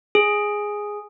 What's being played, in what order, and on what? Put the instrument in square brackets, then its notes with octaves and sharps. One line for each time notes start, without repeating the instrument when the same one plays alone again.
[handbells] G#4